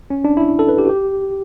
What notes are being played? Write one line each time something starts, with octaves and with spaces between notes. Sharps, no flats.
C#4
D4
E4
A4
B4
G4
F#4
G4